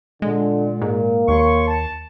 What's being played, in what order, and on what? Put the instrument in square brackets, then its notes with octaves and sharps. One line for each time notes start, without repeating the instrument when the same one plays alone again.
[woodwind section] A#2 [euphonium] D3 [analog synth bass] G#3
[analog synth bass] G#2 [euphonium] A#3
[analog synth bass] D#2 [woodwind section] C#5 C6 C#6
[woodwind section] A5